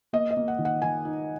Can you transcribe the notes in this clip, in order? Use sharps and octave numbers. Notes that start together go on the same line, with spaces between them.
A#3 D#5
D#5
A#3
F#5
D#3
F#5
D#3 G#5
D#4